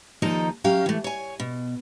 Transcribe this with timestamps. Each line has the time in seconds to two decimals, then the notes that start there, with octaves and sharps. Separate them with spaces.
0.22 D#2 F3 D#4 A4 D#5 A#5
0.64 F#3 C#4 G4 F5
0.86 E3 A3
1.04 C#5 G#5
1.40 B2